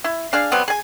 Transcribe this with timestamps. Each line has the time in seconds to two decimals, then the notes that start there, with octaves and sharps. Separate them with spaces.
0.04 E4
0.33 D4 G#4 F5
0.52 F#3 G3 B3 C4
0.68 G#4 G#5